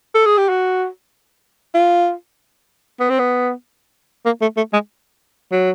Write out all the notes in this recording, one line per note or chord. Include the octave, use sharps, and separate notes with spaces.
A4
G#4
G4
F#4
F4
B3
C4
B3
A#3
A3
A3
G#3
F#3